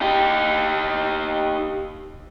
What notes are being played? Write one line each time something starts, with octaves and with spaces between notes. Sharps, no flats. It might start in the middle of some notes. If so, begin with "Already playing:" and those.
D#4 G4